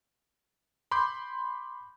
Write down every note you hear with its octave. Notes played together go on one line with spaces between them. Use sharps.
B5 C6 D6 G6